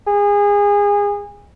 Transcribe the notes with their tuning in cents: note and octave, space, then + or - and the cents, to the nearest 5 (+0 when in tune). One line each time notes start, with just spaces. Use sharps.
G#4 -25